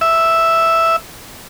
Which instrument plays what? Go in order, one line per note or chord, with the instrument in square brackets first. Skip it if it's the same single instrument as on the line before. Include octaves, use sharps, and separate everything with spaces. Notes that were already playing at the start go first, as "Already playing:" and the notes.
[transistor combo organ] E5